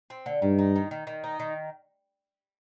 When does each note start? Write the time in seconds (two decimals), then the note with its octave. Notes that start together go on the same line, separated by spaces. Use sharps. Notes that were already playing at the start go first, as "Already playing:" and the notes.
0.10 C4
0.26 D3
0.42 G2 D#3
0.59 D#4
0.76 D#3
0.91 D#3
1.07 D#3
1.24 D#4
1.40 D#3